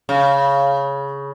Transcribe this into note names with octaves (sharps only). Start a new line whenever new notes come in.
C#3